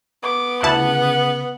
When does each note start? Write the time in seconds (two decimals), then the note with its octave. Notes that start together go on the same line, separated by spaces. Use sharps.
0.23 B3 D6
0.63 D2 C#3 E4 F#5 A5